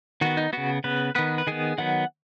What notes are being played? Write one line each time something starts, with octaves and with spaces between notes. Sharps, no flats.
D#3 B3 F#4
D#4
C#3 B3 F#4
C#3 B3 B4
D#3 B3 B4
B4
D#3 B3 G#4
D#3 F#3 B3 F#5